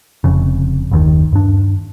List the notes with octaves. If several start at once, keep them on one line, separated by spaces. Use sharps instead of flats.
F1 F2 C#3
F#1 D#2 D#3
G2 D4